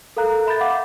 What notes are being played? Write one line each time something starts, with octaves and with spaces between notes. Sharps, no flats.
A4 A#4 F5 A#5 F#6
E5 B5 G6 A6
F5 F#5 D6